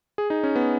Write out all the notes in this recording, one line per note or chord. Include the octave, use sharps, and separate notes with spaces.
G#4
D#4
C#4
B3